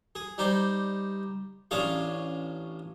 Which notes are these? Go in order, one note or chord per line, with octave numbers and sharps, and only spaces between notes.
G#4
G3 D#4 C5 D5
A1 C#4 D4 F4 G#4 F5